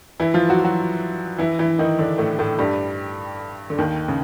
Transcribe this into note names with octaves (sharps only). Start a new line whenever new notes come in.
E3 E4
F3 F4
F#3 F#4
F4
F#3 F#4
E3 E4
E3 E4
D#3 D#4
D3 D4
A2 A3
A2 A3
G2 G3
D3
D#2 D#3
C#3